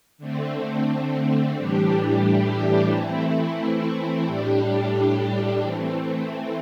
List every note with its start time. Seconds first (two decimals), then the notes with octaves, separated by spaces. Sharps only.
0.18 D3 A3 C4
1.55 A2 E3 G3 D4 G4
2.90 E3 A3 C4 E4
4.26 A2 G3 D4 G4
5.61 E3 A3 C4